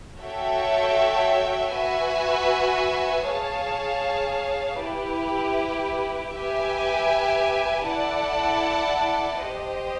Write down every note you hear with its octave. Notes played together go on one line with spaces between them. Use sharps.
F#4 A4 C#5 E5 G5
F#4 B4 E5 G#5
G#4 C#5 F5 A5
E4 G4 B4
G4 B4 E5 G#5
E4 A4 D5 F#5 A5
G4 C5 D#5